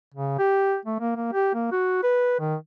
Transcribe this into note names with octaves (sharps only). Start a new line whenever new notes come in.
C#3
G4
A3
A#3
A#3
G4
A#3
F#4
B4
D#3